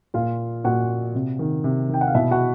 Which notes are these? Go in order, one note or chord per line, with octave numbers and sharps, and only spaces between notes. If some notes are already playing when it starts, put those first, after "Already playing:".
A#2 F4 F5
A#2 F#4 F#5
C3
D#3
C3
D#3 G5
F#5
F5
B2 E4 E5
F#4 F#5